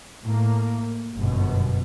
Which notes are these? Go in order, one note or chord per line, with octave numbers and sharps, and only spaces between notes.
A2 A#3
G1 F#2 B2